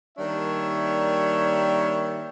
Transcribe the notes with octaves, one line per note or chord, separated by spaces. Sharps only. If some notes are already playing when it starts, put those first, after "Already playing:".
D#3 G3 A#3 D4 C#5 E5